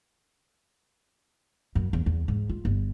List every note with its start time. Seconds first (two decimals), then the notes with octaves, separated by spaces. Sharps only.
1.75 F#2
1.93 E2
2.06 E2
2.28 G#2
2.49 F4
2.65 G1